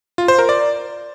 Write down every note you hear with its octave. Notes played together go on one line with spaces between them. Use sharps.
F4
C5
A#4
D5